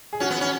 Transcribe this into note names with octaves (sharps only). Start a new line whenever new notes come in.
G#4
C#4 F#4
B3
C#4